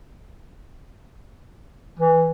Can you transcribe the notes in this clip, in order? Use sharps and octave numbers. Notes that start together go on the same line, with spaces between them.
E3